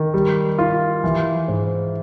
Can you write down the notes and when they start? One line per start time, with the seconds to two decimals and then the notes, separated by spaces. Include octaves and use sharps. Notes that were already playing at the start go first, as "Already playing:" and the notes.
Already playing: D#3
0.14 G3
0.58 F4
1.04 E3
1.48 G#2